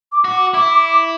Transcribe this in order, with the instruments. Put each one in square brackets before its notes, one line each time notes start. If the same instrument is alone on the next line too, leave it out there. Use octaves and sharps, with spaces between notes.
[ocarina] D6
[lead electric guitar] F#4
[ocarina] D6
[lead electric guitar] E4 [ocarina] D6
[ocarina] D6
D6